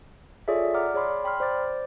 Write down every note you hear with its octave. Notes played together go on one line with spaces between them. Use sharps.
F4 G#4 A4 C#5 D5 E5
D5 F#5 A#5 D6 F6
G#4 C#5 D5 B5 C6 D6
G5 B5 C6 F6
C5 D5 D6 A6